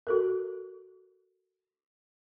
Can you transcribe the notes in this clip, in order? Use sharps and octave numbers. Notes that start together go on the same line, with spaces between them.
F#4 A4 A#4